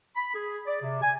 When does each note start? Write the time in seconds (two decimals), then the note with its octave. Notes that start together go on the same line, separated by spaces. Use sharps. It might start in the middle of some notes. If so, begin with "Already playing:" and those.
0.16 B5
0.34 G#4
0.67 D5
0.82 C3
1.02 G#5